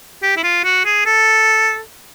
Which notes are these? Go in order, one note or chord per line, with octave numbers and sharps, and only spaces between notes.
G4
E4
F4
F#4
G#4
A4